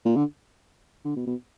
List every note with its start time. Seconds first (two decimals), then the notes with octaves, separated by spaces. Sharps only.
0.05 A#2
0.16 D3
1.05 D3
1.16 B2
1.27 B2